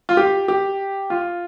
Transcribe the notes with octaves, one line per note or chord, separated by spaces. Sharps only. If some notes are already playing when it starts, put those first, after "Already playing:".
F4
G4
G4
F4